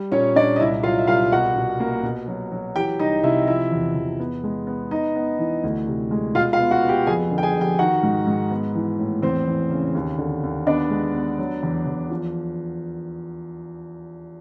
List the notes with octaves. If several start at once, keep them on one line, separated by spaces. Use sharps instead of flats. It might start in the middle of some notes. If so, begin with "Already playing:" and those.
Already playing: G3
A#2 C#4 C#5
A#2 D4 D5
D#5
C2 E4 E5
F#3 F4 F5
E5
C2 F4 F5
B2 F#4 F#5
B2
A#3
B2
F#3
F#3
E3 G4 G5
C2 D#4 D#5
C3 E4 E5
F3 E4 E5
E2
E2
B3
G#3
B3
B3 D#4 D#5
B3
E3
D2
C3
G#3
B2 F4 F5
F4 F5
B3
F#4 F#5
B3
G4 G5
F2 G#4 G#5
D3
G5
G#4 G#5
F2
G4 G5
D#3 F#4 F#5
G#2
G#2
B3
E3
A2
E2 C4 C5
E3
C#3
D#2
D3
D#2
B3 D4 D5
G#3
B3
F#3
E2
E2
F3